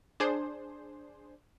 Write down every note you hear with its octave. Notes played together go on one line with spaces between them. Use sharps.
D4 G#4 C5